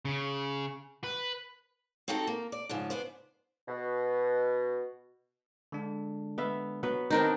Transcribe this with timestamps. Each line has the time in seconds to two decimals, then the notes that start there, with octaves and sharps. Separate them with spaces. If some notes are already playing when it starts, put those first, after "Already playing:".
0.05 C#3
1.04 B4
2.08 C4 D#4 F#4 G4 A4
2.27 A#3
2.52 D5
2.69 G#2 C#3 F3
2.90 B3 D4 C5
3.68 B2
5.72 D3 G#3 D4
6.38 B3 E5 F5
6.83 F#3 B3 B4
7.10 D#3 C4 D4 D#4 A#4